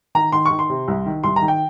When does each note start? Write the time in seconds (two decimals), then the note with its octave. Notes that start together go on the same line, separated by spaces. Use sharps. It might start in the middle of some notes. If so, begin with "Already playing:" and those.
0.15 D#3 A#5
0.32 D#3 C6
0.45 C#6
0.51 D#3
0.59 C6
0.69 C3
0.88 C2
1.06 D#3
1.24 C2 C6
1.36 A#5
1.42 D#3
1.48 G5